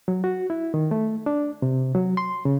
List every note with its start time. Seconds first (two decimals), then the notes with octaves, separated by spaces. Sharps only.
0.08 F#3
0.24 F#4
0.50 E4
0.74 D#3
0.91 A3
1.26 D4
1.62 C3
1.95 F#3
2.17 C6
2.45 C#3